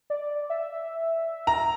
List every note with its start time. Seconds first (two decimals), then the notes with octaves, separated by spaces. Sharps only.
0.10 D5
0.50 E5
1.47 A#5